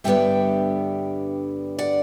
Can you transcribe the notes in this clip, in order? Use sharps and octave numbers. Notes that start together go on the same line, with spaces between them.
G2 D3 G3 B3 D4 E5 G5
D5 F#5